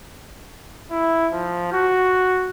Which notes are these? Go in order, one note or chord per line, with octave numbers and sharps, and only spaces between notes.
E4
F3
F#4